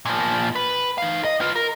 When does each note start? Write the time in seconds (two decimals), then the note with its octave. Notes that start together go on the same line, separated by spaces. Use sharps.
0.05 A#2 F3
0.56 B4
0.98 D#4 F5
1.24 D#5
1.41 F4 B4
1.55 A#4